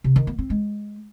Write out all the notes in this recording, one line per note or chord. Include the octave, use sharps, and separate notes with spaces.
C3
D#3
B3
C4
G#3